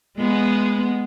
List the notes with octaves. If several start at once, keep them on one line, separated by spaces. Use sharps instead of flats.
G#3 B3